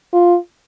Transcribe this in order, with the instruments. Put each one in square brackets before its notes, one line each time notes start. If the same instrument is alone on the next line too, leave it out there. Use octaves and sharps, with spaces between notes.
[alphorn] F4